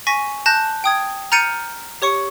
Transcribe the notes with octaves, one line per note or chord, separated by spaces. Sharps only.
G#5 C#6 A#6 B6
A5 F#6 G6 A#6
G5 D#6 G#6
A#5 F6 G6 A6 C#7 D#7
G4 C#5 C#6 C#7